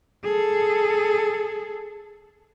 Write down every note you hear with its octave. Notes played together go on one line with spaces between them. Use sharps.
G#4 A4